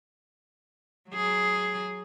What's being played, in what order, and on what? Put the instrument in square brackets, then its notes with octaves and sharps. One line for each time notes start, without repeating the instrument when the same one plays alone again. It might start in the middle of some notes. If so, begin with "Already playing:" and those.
[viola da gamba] F#3 G#4